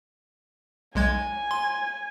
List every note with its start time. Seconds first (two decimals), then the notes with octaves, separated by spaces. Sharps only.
0.95 B1 G#3 G#5 G#6
1.51 C6